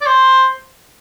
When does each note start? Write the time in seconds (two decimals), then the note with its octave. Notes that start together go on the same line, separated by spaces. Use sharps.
0.01 D5
0.06 C5